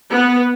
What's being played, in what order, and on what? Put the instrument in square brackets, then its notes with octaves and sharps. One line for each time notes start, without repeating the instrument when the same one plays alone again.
[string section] B3